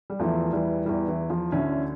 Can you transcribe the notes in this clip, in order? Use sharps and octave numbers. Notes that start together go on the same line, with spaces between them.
G3
E2 E3 F3 A3
E3 G3
E2 E3 G3
E3
F3
D2 D3 C#4 E4